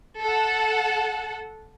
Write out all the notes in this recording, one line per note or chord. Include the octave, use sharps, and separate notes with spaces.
A4 F#5